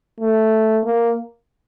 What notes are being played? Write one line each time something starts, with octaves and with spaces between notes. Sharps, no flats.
A3
A#3